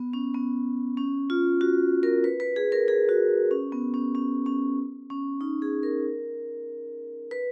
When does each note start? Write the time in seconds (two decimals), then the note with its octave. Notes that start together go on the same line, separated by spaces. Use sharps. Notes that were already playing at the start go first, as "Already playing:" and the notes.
Already playing: B3
0.13 C#4
0.34 B3
0.97 C#4
1.30 F4
1.61 F#4
2.03 A#4
2.24 B4
2.40 B4
2.56 G#4
2.72 A#4
2.88 G#4
3.09 F#4
3.51 C#4
3.72 B3
3.94 C#4
4.15 C#4
4.46 C#4
5.10 C#4
5.41 D#4
5.62 G#4
5.83 A#4
7.31 B4